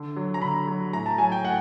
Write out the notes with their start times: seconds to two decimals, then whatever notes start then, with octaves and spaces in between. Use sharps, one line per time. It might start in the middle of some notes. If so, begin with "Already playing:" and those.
Already playing: D3
0.16 F#3
0.34 A#5
0.42 D3 B5
0.67 F#3
0.93 A2 A#5
1.06 A5
1.18 F#3 G#5
1.32 G5
1.44 A2 F#5